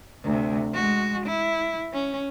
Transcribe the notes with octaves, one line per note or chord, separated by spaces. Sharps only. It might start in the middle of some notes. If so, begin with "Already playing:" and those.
D2 C3
G#3 F#4
E4
C#4